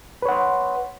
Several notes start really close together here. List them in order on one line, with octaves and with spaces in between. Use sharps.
B4 C#5 F#5 C6